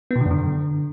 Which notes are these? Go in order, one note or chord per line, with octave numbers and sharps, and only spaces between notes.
B3
B2
D3
F#2
D3